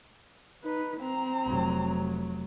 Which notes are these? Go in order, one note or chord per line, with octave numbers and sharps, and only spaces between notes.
D#4 B4
C4 A#5
F1 F#3